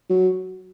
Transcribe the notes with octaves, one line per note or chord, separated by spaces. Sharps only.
F#3